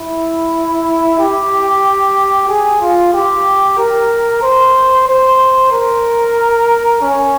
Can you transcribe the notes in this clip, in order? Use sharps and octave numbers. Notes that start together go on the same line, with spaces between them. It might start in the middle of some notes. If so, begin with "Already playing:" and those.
Already playing: E4
G4
G#4
F4
G4
A#4
C5
C5
A#4
C#4